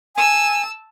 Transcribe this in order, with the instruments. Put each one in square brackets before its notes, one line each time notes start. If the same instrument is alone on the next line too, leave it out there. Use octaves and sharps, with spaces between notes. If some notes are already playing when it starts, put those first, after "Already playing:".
[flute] G#5 [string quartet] A5 E6